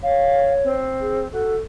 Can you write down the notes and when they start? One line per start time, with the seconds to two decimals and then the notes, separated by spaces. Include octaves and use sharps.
0.03 C#5 F5
0.64 C4
1.01 G#4
1.33 F#4 A4